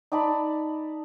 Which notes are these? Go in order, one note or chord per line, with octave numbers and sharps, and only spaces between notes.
D#4 D5 A5 B5